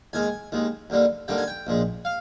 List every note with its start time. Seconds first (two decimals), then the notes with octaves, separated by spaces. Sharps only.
0.13 D#2 D#3 G#3 G#5
0.52 D#2 D#3 G#3
0.90 D#2 D3 G3 A#3
1.28 D#2 D3 G3 A#3 G5
1.38 G#5
1.48 G5
1.67 A#1 A#2 G#3
2.05 F5